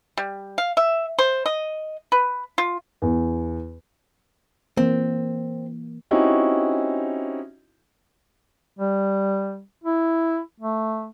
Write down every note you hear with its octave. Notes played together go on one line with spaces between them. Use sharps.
G3
F5
E5
C5
D#5
B4
F4
E2
E3 A#3 C4
C4 C#4 D#4 E4 F#4 G4
G3
E4
A3